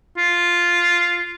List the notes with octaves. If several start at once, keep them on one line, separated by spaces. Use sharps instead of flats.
F4